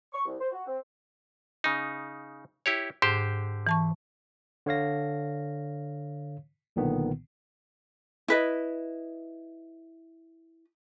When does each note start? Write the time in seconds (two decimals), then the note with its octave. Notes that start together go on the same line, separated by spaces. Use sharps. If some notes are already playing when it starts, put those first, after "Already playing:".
0.13 C#6
0.25 C2
0.40 C5
0.52 F#4
0.66 C4
1.64 C#3 D#4
2.66 E4 G4 C#5
3.02 G#2 D3 G4 C5
3.67 E3 A5 C#6
4.66 D3 C#5 F5 A#6
6.76 B1 A#2 D3 D#3 B3
8.28 E4 B4 D#5